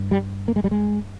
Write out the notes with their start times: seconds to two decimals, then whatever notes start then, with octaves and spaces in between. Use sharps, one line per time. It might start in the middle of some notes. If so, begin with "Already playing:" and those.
Already playing: G2
0.11 G3
0.48 A#3
0.56 G#3
0.64 G3
0.71 G#3